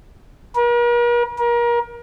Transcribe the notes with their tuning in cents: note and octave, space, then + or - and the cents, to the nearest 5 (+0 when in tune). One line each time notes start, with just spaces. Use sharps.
A#4 +45
A#4 +30